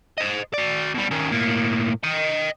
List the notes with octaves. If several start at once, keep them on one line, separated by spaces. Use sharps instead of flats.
C5 D#5
F#4 D5
B2 G3
D#3 C#4
A2 A#3
D#5 G5